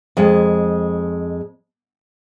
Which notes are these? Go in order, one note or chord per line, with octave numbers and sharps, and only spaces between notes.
F2 G#3